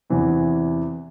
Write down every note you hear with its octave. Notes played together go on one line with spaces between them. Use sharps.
E2 C3 E3 C4